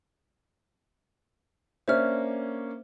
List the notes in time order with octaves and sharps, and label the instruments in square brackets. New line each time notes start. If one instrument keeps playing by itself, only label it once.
[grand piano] A#3 C#4 D4 [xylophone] C5 E5 F6